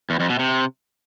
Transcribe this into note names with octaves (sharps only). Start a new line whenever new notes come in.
E2
F2
B2
C3